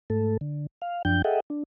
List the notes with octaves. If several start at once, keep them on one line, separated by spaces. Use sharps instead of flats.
G#2 A3 A4
D3
F5
F#2 F3 D4 G5 G6
G#4 A4 D#5 E5 F#5 G5
D4